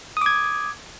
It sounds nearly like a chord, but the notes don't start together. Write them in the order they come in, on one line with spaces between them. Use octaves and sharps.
D#6 D6 G#6